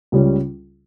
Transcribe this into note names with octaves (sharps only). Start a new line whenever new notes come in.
C#2 C#3 G3 C#4